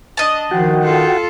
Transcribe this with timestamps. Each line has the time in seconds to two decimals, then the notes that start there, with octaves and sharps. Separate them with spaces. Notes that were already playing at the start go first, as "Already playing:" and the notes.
0.17 D4 D#5 A5
0.51 D#3 F3 F#4 F#5 G5
0.83 F4 A4